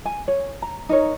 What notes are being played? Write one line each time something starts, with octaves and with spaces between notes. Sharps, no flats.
G#5
C#5
A#5
D#4 A#4 C#5